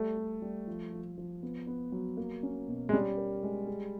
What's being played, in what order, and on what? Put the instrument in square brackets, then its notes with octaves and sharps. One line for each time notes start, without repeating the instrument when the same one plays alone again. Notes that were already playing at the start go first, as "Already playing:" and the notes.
Already playing: [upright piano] G3 [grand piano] A3
[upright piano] G3
G3
F3
F3
F3
B3
B3
F#3
A#3
C#4
B2
[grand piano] G#3
[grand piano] G3 [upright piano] C#4
[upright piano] A#4
G#3
G#4